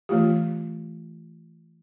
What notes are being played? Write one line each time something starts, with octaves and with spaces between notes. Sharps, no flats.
E3 A3 F4 G4